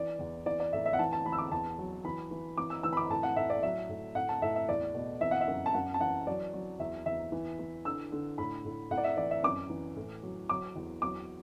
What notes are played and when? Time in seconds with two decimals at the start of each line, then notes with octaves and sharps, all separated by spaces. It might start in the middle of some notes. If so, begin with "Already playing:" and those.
Already playing: E3 D5
0.19 E2
0.46 E3 D5
0.60 D5
0.73 A2 E5
0.85 E5
0.93 F#5
0.99 E3 A5
1.13 A5
1.25 E3 B5
1.32 E6
1.38 D6
1.51 E2 A5
1.78 F#3
2.05 E3 B5
2.31 E3
2.58 E3 D6
2.70 E6
2.83 E3 E6
2.93 B5
2.97 D6
3.10 A2 A5
3.23 F#5
3.36 A2 E5
3.50 D5
3.63 F#3 E5
3.89 A2
4.15 A2 F#5
4.29 A5
4.42 A2 E5
4.55 E5
4.69 E2 D5
4.95 B2
5.21 E3 E5
5.31 F#5
5.41 E5
5.47 F#2
5.66 A5
5.74 F#2 F#5
5.94 A5
6.01 E3 F#5
6.27 F#3 D5
6.53 F#3
6.79 E2 E5
7.06 E2 E5
7.32 E3
7.59 E3
7.85 D3 E6
8.12 D3
8.38 A2 B5
8.65 A2
8.91 A2 F#5
8.98 D5
9.04 E5
9.17 E3 D5
9.31 E5
9.43 F#2 D6
9.70 E3
9.96 A2
10.23 F#3
10.49 F#3 D6
10.76 E2
11.02 F#3 D6